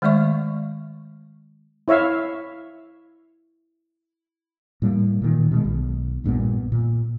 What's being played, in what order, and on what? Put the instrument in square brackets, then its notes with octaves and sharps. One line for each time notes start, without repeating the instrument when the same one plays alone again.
[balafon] D#3 G#3 A3 D5 E5 C#6
[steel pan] E4 C#5 E5 F5
[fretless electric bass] A2 G3 A#3
A#2 D#3
B2 D#3 G3 G#3
B1
A#1 G2 A#2 B3
A#2